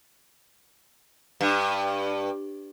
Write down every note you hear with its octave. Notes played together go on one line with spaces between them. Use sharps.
G2